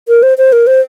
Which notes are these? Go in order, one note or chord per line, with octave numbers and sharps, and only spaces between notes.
A#4
C5
C5
A#4
C5